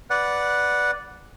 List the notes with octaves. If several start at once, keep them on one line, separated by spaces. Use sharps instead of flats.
B4 D5 F#5